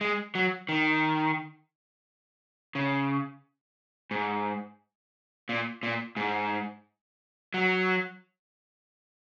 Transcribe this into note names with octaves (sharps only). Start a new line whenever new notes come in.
G#3
F#3
D#3
C#3
G#2
A#2
A#2
G#2
F#3